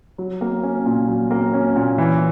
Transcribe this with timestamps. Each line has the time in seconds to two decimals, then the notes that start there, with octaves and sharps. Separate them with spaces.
0.18 F#3
0.41 A#3
0.63 C#4
0.86 A#2
1.08 F#3
1.31 A#3
1.54 C#4
1.76 A#2
1.98 E3